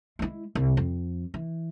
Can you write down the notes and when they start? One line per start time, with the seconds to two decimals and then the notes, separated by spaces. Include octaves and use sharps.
0.19 G#3 E4
0.55 C2
0.77 F2
1.34 E3